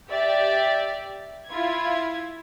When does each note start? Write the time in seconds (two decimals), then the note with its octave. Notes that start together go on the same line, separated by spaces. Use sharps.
0.11 G4 D5 E5
1.48 E4 F4 G#6